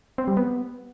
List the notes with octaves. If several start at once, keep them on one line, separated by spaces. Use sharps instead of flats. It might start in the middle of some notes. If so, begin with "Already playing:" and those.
C4
G3
B3